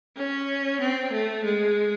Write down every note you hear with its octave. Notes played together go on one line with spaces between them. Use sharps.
C#4
C4
A3
G#3